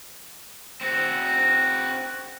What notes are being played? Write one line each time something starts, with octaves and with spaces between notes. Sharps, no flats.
C4 F#4